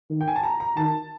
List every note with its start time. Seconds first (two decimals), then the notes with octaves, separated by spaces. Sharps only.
0.10 D#3
0.21 G5
0.28 G#5
0.36 A5
0.43 A#5
0.60 A#5
0.76 D#3 A5